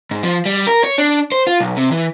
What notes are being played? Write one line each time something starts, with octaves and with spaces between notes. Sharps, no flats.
G#2
F3
G3
A#4
C#5
D4
C5
F4
B1
C3
E3